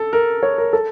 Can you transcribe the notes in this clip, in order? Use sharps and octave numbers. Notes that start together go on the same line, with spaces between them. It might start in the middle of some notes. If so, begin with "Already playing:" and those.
Already playing: A4
A#4
C#5
A#4
A4